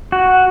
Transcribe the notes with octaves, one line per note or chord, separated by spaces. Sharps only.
F#4